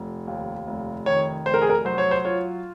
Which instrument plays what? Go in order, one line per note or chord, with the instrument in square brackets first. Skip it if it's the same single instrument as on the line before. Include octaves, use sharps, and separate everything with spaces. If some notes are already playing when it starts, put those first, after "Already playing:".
Already playing: [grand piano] F1
D#2
F1
D#3 C#5
F1 C5
A#4
G#4
A#4
F#3 C5
C#5
C5
F4 C#5